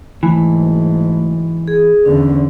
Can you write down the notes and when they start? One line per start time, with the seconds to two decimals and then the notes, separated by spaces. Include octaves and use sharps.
0.23 F#1 G#2 E3 A3
1.68 G#4
2.05 E2 D3 C#4